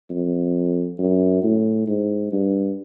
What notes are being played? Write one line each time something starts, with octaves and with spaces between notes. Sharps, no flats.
F2
F#2
A2
G#2
G2